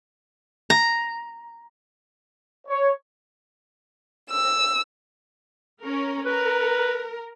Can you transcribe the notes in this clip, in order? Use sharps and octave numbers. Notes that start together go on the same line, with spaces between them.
A#5
C#5
E6
C#4 A#4
A#4 B4